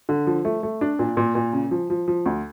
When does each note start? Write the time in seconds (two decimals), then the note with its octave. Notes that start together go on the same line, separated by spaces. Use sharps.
0.09 D3
0.27 F3
0.45 A3
0.63 A3
0.81 D4
0.99 A#2
1.17 A#2
1.35 A#2
1.53 C#3
1.71 F3
1.90 F3
2.08 F3
2.26 D2